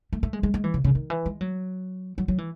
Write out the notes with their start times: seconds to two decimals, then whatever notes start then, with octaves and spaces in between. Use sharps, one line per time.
0.13 A3
0.23 A3
0.33 G#3
0.43 G#3
0.54 G#3
0.64 E3
0.74 C#3
0.84 C#3
0.95 D#3
1.10 E3
1.26 G#3
1.41 F#3
2.18 F#3
2.28 F#3
2.38 E3